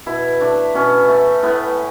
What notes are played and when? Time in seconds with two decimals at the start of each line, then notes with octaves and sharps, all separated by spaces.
0.06 B2 E4
0.40 A3 D4
0.74 B2 C#4
1.08 A3
1.43 A2 B3